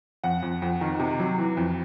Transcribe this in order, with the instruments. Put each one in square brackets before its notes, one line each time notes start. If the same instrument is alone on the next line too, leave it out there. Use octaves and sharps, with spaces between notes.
[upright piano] F2 F#5
F2
F2
D#3
C3
F#3
E3
F2